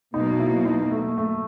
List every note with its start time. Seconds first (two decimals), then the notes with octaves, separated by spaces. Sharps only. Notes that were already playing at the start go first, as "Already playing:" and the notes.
0.14 B2 F#3 A#3 D#4
0.40 E4
0.65 D#4
0.91 A3
1.18 A3